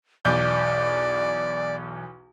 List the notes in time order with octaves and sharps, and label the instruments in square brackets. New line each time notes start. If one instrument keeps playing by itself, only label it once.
[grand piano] B1 E2 G6 [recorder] D5